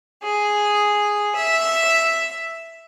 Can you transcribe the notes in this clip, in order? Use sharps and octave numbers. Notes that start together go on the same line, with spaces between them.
G#4
E5